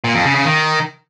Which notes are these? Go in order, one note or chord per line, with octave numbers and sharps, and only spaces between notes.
A#2
F2
C#3
C#3
D#3